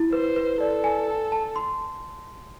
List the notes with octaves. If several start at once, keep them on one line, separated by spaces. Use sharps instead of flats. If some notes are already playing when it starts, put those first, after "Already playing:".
Already playing: E4
B4 C5
B4
A4 D5
G#5
A5
A5
C6